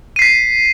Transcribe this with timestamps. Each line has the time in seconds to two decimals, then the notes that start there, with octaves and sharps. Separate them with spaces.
0.16 D#7
0.19 C7
0.22 B6